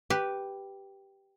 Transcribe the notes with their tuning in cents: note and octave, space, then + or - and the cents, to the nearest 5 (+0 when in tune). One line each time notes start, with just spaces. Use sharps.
G4 +0 B4 +0